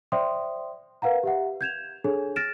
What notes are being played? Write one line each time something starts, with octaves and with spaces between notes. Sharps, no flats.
C5 D5 E5 G5 C6 D#6
A#4 B4 F5 F#5 A#5
G4 E5 F#5
G6 G#6 E7 F7
D4 G#4 A4 C#5
F6 A6 A#6 D7 E7